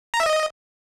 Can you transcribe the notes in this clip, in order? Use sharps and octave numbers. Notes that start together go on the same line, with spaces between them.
A#5
E5
D#5